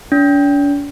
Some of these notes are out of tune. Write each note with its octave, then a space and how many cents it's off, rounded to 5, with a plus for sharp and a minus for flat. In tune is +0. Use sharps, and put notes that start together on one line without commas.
D4 -45